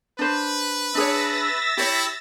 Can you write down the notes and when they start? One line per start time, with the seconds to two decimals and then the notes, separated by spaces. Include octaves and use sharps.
0.19 D4 B4 C5
0.95 D4 G#4 C#5 E5 E6 A6 A#6
1.77 E4 G4 C#5